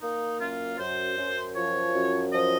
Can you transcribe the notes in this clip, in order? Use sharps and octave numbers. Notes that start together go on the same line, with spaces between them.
A#3 D#4
F#2 F4
F#2 C5
F#2
F3 C#5
F#2
F3 D#5